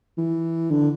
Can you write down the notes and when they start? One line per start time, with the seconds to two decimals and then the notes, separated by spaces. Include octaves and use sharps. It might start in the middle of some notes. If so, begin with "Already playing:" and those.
0.18 E3
0.71 D3